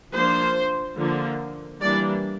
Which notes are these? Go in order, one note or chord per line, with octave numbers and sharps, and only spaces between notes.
F3 A#3 D4 C5
D3 F3 A#3
E3 G3 A#3 D4 D5